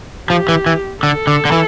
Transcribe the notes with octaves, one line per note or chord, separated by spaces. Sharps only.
F3 G4
E3
E3
D3 A4
D3
D3
E3